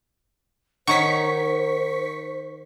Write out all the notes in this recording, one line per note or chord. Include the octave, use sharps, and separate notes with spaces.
D#3 D#4 C5 C#5 F#5 C#6 B6